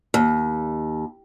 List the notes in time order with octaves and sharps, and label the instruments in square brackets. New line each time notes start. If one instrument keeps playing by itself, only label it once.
[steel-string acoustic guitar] D#2